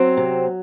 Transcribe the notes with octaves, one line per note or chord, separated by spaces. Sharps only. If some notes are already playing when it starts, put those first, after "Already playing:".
Already playing: F#3 C4
C3